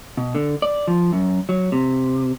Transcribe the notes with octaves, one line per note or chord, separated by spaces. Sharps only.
B2
D3
D5
F3
F#2
F#3
C3